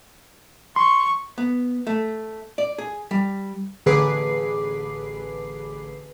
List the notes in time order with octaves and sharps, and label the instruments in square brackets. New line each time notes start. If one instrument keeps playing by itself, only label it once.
[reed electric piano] C6 [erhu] C#6
[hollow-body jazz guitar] B3
A3
D5
G#4
G3
[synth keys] A1 D3 G#4 B4 D6 C7